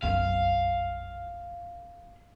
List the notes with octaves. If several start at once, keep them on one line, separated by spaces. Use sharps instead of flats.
F1 B1 F#2 F5